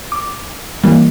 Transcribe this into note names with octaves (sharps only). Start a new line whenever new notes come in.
D6
E3 G3 A#3